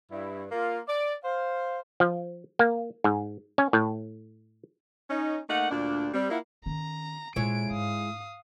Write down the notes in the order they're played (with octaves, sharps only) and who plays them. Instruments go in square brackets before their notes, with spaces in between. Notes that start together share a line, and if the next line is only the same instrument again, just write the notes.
[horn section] G2 E4
A#3 F4
D5
C5 F5
[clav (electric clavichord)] F3
A#3
G#2
C#4
A2
[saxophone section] C#4 D#4
A3 A#3 D#4 F#5
D2 A#2 D4
G3 C4
A#3 E4 F4 E5 F#5
[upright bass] D#3 C#4 [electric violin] A#5
[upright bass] A#2 [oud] G#3 E4 C#5 [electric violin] D7
[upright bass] G#2 [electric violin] F5 D#6